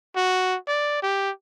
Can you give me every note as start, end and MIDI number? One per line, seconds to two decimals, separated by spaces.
0.16 0.56 66
0.68 1.03 74
1.03 1.31 67